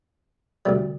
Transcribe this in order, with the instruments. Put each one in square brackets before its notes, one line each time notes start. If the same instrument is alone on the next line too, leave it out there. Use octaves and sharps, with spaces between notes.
[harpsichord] D2 C3 G3